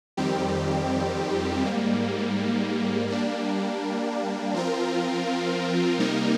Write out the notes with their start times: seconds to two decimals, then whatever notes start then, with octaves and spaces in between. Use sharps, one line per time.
0.17 F2 D#3 G3 C4 G4
1.63 G#2 G3 A#3
3.08 G3 A#3 D4
4.53 F3 C4 F4 A#4
5.99 C3 G3 A#3 D#4 A#4